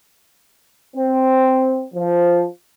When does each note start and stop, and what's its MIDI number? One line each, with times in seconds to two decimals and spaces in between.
0.95 1.83 60
1.94 2.44 53